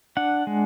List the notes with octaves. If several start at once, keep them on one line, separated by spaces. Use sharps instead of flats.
D4 F#5
G#3